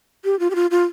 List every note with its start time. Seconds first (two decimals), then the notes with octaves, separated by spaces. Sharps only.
0.25 G4
0.40 F4
0.50 G4
0.55 F4
0.71 F4